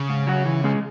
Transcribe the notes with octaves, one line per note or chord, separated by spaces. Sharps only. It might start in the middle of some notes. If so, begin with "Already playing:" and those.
Already playing: C#3
G#2
F#3 C#4 F#4
E3
G#3 C#4 G#4